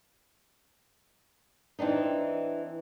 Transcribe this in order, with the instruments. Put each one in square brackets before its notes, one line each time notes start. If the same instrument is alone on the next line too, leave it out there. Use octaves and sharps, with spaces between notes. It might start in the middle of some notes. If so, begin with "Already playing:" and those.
[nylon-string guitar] E3 C4 D4 D#4